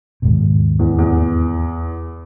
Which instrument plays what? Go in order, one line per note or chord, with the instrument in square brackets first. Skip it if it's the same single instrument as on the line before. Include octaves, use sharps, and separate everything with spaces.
[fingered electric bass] D#2 G#2 B2
[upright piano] E2
E2